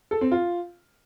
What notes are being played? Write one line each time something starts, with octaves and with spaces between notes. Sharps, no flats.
A4
C4
F4